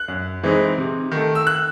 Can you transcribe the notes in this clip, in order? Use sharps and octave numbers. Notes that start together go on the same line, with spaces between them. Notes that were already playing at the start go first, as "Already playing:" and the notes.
Already playing: F#6
F#2
E3 G#3 C4 D#4
C3
D#3 A3
E6
F#6